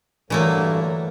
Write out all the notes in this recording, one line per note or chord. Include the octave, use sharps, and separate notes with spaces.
G2 D3 E3 F#3 A3 A#3